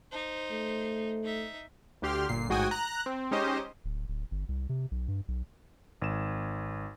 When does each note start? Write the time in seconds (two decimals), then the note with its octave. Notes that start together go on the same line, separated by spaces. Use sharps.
0.11 D#4 C5
0.52 A3
1.24 D#4 E5
2.02 D2 D3 G4 C6 F6
2.29 G1 A#2 C7
2.49 A1 G#2 F#4 G5 G#5 D#6
2.71 A#5 F#6
3.06 C4
3.31 G#3 C#4 D#4 G4 C5 D#5
3.84 D1
4.08 D1
4.31 G1
4.49 C2
4.69 C3
4.91 B1
5.08 G2
5.28 B1
6.02 G#1 E7